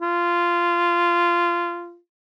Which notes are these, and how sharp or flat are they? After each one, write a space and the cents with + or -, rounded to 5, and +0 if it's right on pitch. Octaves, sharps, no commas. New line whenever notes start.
F4 -15